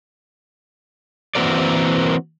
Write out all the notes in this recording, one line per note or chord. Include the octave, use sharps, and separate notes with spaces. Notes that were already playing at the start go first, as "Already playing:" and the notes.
E3 A#3 C4 F#4 A#4 D5